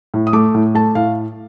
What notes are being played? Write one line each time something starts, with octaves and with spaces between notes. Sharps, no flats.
A2
D#6
A3 D6
A2
A3 A5
A2 F5